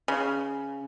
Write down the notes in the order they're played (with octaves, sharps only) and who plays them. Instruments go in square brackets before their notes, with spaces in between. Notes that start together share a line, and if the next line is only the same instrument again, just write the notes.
[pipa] C#3